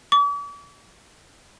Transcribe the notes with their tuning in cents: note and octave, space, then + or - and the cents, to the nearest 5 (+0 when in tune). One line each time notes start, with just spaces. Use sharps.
D6 -45